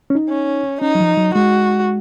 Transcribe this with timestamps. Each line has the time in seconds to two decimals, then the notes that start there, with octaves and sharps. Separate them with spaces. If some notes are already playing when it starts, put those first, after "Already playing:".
0.10 C#4
0.15 D#4
0.29 C#4
0.82 C#4 D#4
0.95 F#3
1.00 F3
1.17 F#3
1.35 G#3 F#4